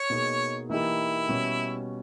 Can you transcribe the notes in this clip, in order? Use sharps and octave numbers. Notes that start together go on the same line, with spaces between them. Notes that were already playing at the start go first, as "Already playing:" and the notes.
Already playing: C#5
B2 A#3 D#4 G#4
E3 A#3 D#4 E4 G4
B2 G3 C#4